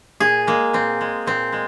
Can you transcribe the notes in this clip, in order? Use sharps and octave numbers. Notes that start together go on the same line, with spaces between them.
A#2 G#4
G#3 A#3
A#2 C4
G#3
A#2 C4
G#3